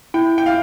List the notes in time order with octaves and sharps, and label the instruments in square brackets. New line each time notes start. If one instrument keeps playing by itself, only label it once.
[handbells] E4 [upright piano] G5
[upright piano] G5
F5